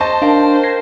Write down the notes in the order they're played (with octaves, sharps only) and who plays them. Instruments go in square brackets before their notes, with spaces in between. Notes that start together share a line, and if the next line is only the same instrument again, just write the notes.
[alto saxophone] C5 [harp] D#5 [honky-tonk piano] A5 [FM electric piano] C#6
[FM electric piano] D4 [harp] A#4 F5 G5
[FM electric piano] G#6 A#6 C7